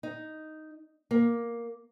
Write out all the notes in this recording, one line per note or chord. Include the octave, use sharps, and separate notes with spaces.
D#4
A#3